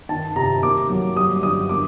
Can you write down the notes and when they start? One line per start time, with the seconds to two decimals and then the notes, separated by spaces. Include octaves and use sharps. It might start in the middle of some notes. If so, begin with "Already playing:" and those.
0.09 D#3 A5
0.36 C3 A#5
0.62 A#3 D6
0.90 F#3
1.16 G3 D#6
1.43 D3 D#6
1.69 A#3 D6